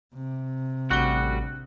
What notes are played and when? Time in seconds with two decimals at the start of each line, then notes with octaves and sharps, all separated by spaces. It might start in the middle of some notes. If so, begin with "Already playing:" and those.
0.15 C3
0.90 A1 D2 G3 F#4 F#6 G7